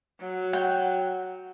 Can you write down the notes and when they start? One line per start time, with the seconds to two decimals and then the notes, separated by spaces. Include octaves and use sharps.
0.20 F#3
0.53 F#4 G5